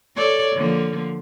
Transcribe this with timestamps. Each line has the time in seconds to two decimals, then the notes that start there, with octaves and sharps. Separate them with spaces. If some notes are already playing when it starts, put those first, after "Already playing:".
0.16 A4 C#5 D5
0.55 D3 F3 A#3